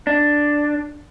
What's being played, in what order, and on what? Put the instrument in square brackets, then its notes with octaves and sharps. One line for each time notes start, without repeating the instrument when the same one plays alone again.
[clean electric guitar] D4